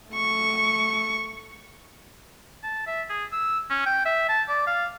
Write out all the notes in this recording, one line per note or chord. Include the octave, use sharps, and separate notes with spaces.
A3 C#6
A5
E5
G#4
E6
C#4
G5
E5
A5
D5
F5